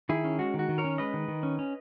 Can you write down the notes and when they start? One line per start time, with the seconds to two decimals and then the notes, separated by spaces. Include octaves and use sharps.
0.09 D#3 E4 G#4
0.24 C#4
0.39 G#3 F#4
0.54 D#3
0.59 F#4
0.69 D#3
0.78 A#4 C#5
0.84 C#4
0.98 G#3 B4 D#5
1.14 D#3
1.28 D#3
1.43 C#4
1.59 C#4